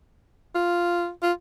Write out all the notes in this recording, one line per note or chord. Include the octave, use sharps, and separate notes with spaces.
F4
F4